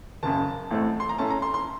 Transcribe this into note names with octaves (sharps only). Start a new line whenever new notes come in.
F#1 F#2 C#3 A5
A1 A2 A3 C4
C6
A#5
A2 A3 C#4 A5
A#5
C6
C6